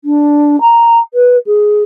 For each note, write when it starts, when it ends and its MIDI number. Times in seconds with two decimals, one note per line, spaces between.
0.05 0.59 62
0.61 0.99 82
1.14 1.37 71
1.47 1.83 68